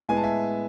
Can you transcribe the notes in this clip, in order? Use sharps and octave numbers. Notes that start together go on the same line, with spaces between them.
A2 G#3 B3 G#5
A5
E5 G#5